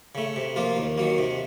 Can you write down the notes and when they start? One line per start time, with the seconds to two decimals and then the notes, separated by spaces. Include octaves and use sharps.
0.15 C#3 A3
0.36 C3
0.56 F3 A#3 F4
0.77 D#2
0.98 D#3 F#3 A#3
1.18 C3